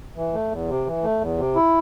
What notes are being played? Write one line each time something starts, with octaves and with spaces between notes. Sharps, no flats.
E3
A3
E2
C3
E3
A3
E2
C3
E4